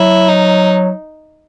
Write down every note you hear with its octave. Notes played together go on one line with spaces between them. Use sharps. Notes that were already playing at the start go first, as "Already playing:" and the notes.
Already playing: F#3 E4
D#4